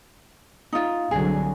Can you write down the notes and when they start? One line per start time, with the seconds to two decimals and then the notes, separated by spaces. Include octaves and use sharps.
0.73 D#4 F4
1.11 C2 D3 F#3 G#4